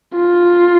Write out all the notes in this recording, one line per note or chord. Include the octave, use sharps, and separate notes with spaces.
F4